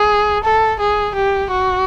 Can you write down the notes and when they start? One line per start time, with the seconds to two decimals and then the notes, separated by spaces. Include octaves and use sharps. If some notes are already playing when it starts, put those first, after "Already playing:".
Already playing: G#4
0.44 A4
0.80 G#4
1.15 G4
1.51 F#4